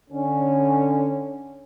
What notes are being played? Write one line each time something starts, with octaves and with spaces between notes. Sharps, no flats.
D3 C#4